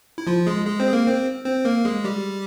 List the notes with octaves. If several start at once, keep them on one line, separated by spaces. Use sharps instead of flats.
E4
F3 F4
G#3 G#4
G#3 G#4
C4 C5
G#4
A#3 A#4
C4 C5
C4 C5
A#3 A#4
G#3 G#4
G3 G4